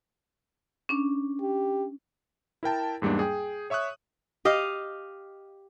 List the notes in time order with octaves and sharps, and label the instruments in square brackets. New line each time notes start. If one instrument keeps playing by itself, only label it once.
[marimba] C#4 D4
[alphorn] G4
[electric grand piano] E4 A#4 G5 A5
E2 G#2 G3 A#3 D4
G#4 G5
C#5 E5 C#6 D#6 F#6
[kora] G4 D#5 F5